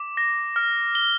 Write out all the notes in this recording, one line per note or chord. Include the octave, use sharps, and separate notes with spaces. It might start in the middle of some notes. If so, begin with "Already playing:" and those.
Already playing: D6
A#6
F6
G7